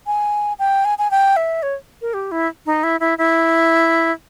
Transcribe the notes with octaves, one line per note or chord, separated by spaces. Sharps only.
G#5
G5
G#5
G#5
G5
E5
C#5
A#4
G4
E4
D#4
E4
E4
E4